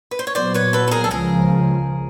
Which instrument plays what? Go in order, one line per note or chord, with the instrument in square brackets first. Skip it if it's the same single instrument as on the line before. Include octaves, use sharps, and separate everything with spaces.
[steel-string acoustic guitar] B4
C5
C#5
[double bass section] A#2 F#3 B3 [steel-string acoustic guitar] C5 D5
[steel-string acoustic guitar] B4 C#5
A4 B4
A4
G#4 A#4
A4
[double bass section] C#2 C#3 F3 [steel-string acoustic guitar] G#4 A#4